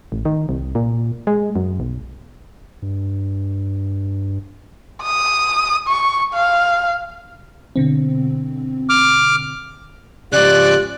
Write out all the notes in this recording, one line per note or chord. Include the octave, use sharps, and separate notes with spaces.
A1
D#3
C2
A#2
G#3
F#2
B1
G2
D#6
C#6
F5
B2 D3 C4
D6 F6
G#2 C#3 F3 F4 G4 D5 F#6